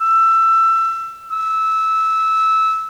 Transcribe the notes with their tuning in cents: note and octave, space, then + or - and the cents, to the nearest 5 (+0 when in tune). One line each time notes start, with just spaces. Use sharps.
E6 +20
E6 -15